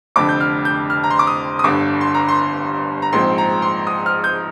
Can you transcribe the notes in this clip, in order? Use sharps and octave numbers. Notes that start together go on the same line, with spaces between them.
F1 F2 D3 D6
G6
F6
G6
F6
A#5
C6
D6
D#6
D#6
G1 G2 D3 D6
C6
A#5
C6
A#5
A#1 G#2 F3 C4 C6
A#5
C6
D#6
F6
G6